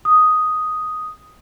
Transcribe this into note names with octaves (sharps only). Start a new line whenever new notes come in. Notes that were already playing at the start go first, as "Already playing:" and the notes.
D#6